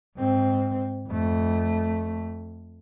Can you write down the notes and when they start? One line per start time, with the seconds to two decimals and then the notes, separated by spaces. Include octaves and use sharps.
0.17 G#2 C4
1.09 F2 A3